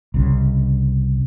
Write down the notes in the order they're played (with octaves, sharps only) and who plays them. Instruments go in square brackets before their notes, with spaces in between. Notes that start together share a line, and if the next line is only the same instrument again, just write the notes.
[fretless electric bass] C2 C#3